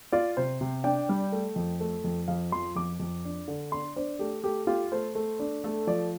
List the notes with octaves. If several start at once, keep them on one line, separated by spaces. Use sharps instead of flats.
F4 D5
C3 C5
C3
D4 G5
G3
A3
F2
A3
F2
F2 F5
F3 C6
F2 D6
F2
D4
D3
D4 C6
D4 C5
A3 G4
A3 G4
F4 G4
A3 C5
A3
D4
A3 A4
F3 D5